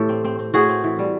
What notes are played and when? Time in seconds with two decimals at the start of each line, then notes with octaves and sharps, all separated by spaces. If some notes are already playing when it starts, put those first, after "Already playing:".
Already playing: A2 E3 G4 A4
0.09 C4
0.24 C4
0.39 C4
0.54 A2 F#4 G#4
0.69 C4
0.84 E3
0.99 G3